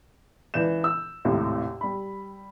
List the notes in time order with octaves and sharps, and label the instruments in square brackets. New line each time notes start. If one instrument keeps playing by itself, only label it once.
[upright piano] C#2 E3 D5 G6 E7
E6
G#1 D#2 A2 C3
G3 B5